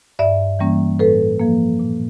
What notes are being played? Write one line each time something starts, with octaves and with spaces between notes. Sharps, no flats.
G2 D5 E5
E3 G3 A#3 C#4
A2 A4 B4
F3 A#3
A#2